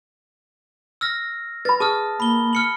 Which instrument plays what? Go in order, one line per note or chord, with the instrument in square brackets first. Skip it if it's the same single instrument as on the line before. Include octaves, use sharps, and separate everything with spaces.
[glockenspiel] E6 F6 A#6
[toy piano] B4 B5 [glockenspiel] A6
[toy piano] G#4 [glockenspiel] A5 D#6 F6
[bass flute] A#3 [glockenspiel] B5 G7
[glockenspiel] F6 C#7 F#7